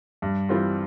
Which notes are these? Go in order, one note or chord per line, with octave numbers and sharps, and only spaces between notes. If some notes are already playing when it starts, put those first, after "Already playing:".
G2
E3 G3 C4 F4